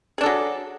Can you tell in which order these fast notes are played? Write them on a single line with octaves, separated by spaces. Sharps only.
G#4 D4 A4 F#3